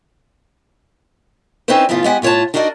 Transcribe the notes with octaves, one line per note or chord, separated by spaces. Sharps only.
C4 C#4 D#4 E4 B4 C5
F#2 A2 C#3 B3 F4
G#3 B3 G4 F#5 G#5
A2 F4 C#5 F#5 A5
D4 D#4 F#4 A#4 D5 D#5